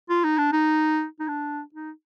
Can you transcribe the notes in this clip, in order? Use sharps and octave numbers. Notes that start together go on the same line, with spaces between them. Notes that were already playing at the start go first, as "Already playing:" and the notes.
F4
D#4
D4
D#4
D#4
D4
D#4